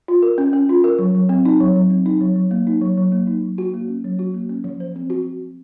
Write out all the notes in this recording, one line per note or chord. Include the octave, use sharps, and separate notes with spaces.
F4
A#4
C#4
C#4
F4
A#4
F#3
F#3
C4
D#4
F#3
F#3
C4
D#4
F#3
F#3
A#3
D#4
F#3
F#3
A#3
D#4
F#3
F#4
A#3
C#4
F#3
F#4
A#3
C#4
F3
C5
C4
F#4